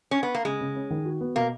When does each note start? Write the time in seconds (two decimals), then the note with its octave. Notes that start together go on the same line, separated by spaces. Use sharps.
0.11 C#4
0.23 B3
0.35 A#3
0.45 C#3 G#3
0.61 C#3
0.76 C#4
0.90 D#3
1.05 F#4
1.21 B3
1.36 B2 A#3